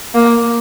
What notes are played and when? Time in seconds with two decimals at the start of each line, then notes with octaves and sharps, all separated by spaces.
0.15 A#3